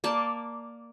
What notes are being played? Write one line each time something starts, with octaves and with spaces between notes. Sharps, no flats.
A#3 D5 A5